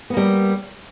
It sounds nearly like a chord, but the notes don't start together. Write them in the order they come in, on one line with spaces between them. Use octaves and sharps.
B3 A#3 G3